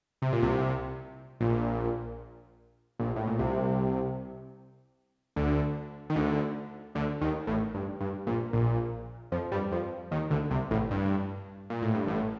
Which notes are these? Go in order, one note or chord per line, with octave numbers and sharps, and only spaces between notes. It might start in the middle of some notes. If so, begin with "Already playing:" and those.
C3
A#2
C2 C3
A#1 A#2
A#1 A#2
A2
A#2
C2 C3
D2 D3
D#3
D2 D3
D2 D3
D#2 D#3
A1 A2
G2
G2
A#1 A#2
A#1 A#2
F2 F3
G2 G3
F2 F3
D#2 D#3
D2 D3
C2 C3
A1 A2
G2
A#2
A2
G2
A1 A2